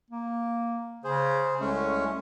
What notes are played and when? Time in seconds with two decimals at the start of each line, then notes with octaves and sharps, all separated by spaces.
0.10 A#3
1.04 C#3 G#4 C5
1.60 C2 G#3 A3 C#4